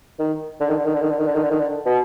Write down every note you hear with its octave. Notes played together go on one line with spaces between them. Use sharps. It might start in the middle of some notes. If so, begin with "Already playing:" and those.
D#3
D3
D#3
D3
D#3
D3
D#3
D3
D#3
D3
D#3
D3
D#3
D3
B2